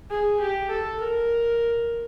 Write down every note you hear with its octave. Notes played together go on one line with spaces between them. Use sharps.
G#4
G4
A4
A#4